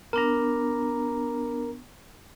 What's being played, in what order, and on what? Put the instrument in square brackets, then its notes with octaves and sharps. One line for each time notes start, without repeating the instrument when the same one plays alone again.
[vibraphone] B3 D4 [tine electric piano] A#4 A#5